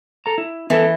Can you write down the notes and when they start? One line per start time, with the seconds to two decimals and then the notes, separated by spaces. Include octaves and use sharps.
0.26 A4 A#5
0.38 E4
0.70 E3 B3 A4 A#4